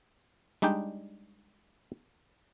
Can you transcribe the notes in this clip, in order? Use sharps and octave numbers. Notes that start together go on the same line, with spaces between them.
G3 G#3 D4 D#4 G5